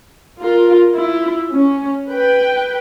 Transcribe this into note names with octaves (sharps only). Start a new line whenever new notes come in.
F4 A#4
E4 F4
C#4
B4 G5